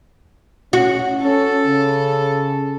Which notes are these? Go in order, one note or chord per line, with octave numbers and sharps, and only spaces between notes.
C#4 F#4
C#4 A4
C#3